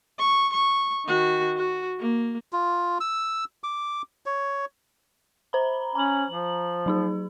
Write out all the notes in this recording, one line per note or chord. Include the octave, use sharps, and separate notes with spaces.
C#6
C#6
D#3 F#4
F#4
A#3
F4
E6
D6
C#5
C5 A#5 B5
C#4 A#5 F#7
F3
F#3 D#4 G#4